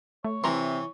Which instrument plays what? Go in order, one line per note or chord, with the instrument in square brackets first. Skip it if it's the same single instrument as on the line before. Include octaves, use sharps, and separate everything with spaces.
[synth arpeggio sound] A3 [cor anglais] C#5
[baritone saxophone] C3 [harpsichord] E3 [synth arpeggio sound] A#5 C6